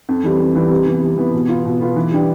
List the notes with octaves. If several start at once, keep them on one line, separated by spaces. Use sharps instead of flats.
F2
E3 G3
F2
E3 G3
C3
E3 B3
C3
E3 B3
B2
B3 F4
B2
B3 F4
E3
G3 D4 G4